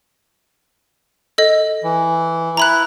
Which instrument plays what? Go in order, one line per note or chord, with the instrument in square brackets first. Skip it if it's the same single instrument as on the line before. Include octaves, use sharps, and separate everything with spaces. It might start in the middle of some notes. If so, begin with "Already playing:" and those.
[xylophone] A4 D#5
[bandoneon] E3
[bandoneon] E4 [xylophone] A#5 B5 F#6